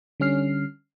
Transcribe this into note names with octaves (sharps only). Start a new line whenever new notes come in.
D3 G3 C#4 F6 C7